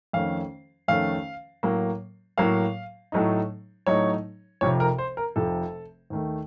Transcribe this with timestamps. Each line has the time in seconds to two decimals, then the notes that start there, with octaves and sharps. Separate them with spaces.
0.13 F2 D#3 A3 C#4 F5
0.88 F2 D#3 A3 C#4 F5
1.63 A2 F#3 A#3
2.38 A2 F#3 A#3 F5
3.12 A2 F#3 A3 D#4
3.87 A2 F#3 A3 D#4 C#5
4.61 F1 F2 C3 F3 C#5
4.80 A#4
4.98 C5
5.17 A#4
5.36 F1 F2 C3 F3 A4
6.10 D#2 D#3 A3